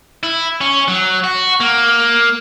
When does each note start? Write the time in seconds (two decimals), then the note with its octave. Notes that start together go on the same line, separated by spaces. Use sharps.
0.23 E4
0.61 C#4
0.88 F#3
1.24 F#4
1.60 A#3